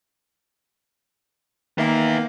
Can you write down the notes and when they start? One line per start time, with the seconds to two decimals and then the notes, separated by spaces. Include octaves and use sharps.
1.78 D#3 A#3 B3 E5